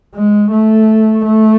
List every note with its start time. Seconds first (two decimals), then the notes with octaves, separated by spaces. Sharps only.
0.15 G#3
0.51 A3
1.25 A3